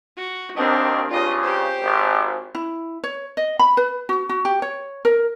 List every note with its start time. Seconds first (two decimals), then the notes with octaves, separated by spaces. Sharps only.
0.17 F#4
0.57 D#2 D3 D#3 C4 D4
1.11 G2 C#3 F4 D#5
1.43 G4 C5
1.82 G#1
2.55 E4
3.04 C#5
3.37 D#5
3.59 B5
3.77 B4
4.09 F#4
4.29 F#4
4.45 G4
4.62 C#5
5.05 A#4